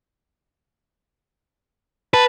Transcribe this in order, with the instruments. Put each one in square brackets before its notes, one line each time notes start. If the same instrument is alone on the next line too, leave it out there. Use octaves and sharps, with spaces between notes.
[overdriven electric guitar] B4 [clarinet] A5